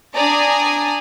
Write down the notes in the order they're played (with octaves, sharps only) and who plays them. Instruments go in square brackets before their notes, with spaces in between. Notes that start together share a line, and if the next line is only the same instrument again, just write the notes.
[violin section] D4 D5 G#5 A#5 D#6